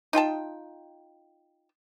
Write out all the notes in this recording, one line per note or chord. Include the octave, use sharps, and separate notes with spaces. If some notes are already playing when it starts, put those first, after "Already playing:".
D#4 F4 G5 A5